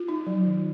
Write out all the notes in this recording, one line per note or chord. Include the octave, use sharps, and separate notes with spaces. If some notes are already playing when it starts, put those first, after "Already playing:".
Already playing: F4
D#4
F#3
D#3